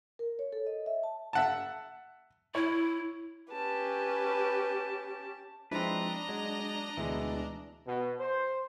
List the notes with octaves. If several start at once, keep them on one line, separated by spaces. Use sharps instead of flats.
A#4
C#5
A4
D#5
E5
A5
E5 F#5 A5
E4 C#5
C#4 G4 B4 A5
F3 G#3 C4 D4 E4 B4 D#5 A#5
F#3 G#3
D2 B2 E3 G#3
B2
C5